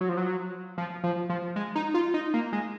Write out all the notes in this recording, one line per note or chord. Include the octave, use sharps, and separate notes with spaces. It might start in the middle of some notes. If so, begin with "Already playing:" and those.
F#3
F3
F#3
F3
F3
F3
G#3
D#4
F4
D#4
A#3
G#3